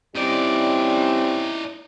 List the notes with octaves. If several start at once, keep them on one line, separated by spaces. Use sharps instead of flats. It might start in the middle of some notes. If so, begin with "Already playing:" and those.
G3 C4 C#4 D#4 E4 D5